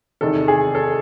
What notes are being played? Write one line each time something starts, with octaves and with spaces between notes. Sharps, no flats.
E2 C3 D#3 A4
G#4
A4